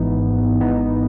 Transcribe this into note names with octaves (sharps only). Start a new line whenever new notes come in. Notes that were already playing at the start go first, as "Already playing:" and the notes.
Already playing: G#1 G#2 E3 B3 D#4
G#1 G#2 E3 B3 D#4